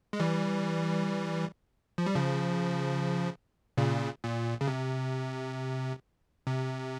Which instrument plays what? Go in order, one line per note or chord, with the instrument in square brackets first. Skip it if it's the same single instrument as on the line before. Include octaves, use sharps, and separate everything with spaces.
[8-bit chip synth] G#3
E3 G3
F3
G3
C#3 F3
A#2 C#3
A#2
C#3
C3
C3